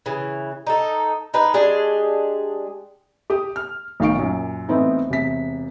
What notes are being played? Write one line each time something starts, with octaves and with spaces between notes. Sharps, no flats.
C#3 E3
D#4 A4
D#4 G#4 B4
G#3 D4 G4 G#4
G4 D#6
F6
B1 D#3 F5 C#6 D7
F#2 A#2
A2 E3 B3 C4 D#4 E4
E1 C3 B6